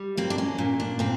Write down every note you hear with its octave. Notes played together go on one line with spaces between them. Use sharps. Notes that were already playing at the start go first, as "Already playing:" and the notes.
Already playing: G3
A#3 C4
D4
C#4
A#2
D4
A#2 C4